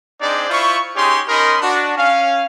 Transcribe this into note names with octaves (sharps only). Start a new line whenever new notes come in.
C4 D4 D#4 G#4 C5 D5
E4 F4 C5 B5 C#6
C#4 D#4 G4 G#4 C#5 C6
C#4 D#4 A#4 D#5 B5 C6
D4 F#4
C#4 F5